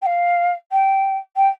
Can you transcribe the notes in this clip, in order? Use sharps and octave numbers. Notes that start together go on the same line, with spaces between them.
G5
F5
G5
G5